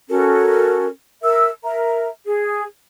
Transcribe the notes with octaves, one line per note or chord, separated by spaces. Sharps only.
C#4 F#4 A4 A#4
A#4 E5 E6
A#4 E5 A#5
G#4